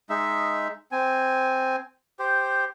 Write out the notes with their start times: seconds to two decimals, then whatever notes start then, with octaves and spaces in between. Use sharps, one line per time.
0.10 G#3 D#4 E5
0.92 C4 G#5
2.19 G4 C5